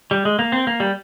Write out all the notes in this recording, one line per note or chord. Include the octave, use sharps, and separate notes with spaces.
G3
G#3
A#3
C4
A#3
G3